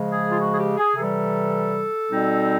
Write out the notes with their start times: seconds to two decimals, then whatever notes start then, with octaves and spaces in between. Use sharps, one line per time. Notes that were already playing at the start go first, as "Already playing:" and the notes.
Already playing: C#3 F3 G#3
0.11 G#4
0.30 F4
0.39 F#4
0.53 G#4
0.58 G4
0.77 G#4
0.96 C3 E3 G3 A4
2.10 B2 G3 C4 D#4